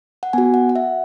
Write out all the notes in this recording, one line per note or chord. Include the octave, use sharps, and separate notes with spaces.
F#5
B3 F#4 G#5
F#5
F#5
E5